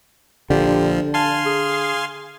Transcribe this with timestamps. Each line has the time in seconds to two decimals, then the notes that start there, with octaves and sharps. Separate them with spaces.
0.50 A#1 D3 F3 G4
1.14 F5 G#5 A5 C6
1.46 G#4